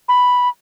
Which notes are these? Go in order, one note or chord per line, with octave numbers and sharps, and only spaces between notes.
B5